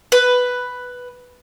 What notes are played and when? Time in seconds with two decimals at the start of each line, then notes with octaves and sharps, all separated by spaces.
0.12 B4